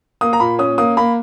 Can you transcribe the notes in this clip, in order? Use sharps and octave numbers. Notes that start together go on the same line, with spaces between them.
A#3 D#6
A#5
A#2 B5
C#4 D#6
A#3 D#6
A#3 B5